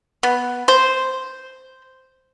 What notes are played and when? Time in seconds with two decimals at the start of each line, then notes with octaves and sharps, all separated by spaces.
0.23 B3
0.68 C5